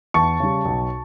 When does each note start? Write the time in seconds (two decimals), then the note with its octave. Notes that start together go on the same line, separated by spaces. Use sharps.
0.14 E2 A5 C#6
0.40 C#3 G3
0.65 B1